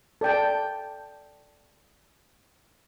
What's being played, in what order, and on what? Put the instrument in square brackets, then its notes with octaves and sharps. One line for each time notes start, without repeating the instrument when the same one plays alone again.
[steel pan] A4 D5 G5 A5